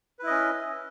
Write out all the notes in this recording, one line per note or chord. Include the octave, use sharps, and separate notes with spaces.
C#4 E4 B4 D#5